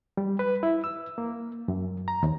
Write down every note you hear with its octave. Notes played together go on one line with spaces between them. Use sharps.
G3
B4
E4
E6
A#3
F#2
A#5
D#2